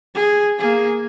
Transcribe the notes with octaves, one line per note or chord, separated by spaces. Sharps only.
G#4
A#3 G#4